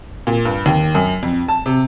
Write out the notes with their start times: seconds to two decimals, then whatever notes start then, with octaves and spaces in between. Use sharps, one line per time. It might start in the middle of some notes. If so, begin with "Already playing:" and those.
0.27 A#2
0.45 G2
0.66 D#2
0.95 F#2
1.23 F2
1.48 A5
1.66 C3